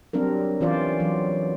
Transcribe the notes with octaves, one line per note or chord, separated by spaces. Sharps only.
F#3 G3 C4 D4 A#4
E3 C#4 F4 C5 D5
E3 F#3